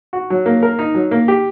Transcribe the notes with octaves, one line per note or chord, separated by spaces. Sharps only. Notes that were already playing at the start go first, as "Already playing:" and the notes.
F#4
F#3
A#3
A#4
D#4
F#3
A#3
G4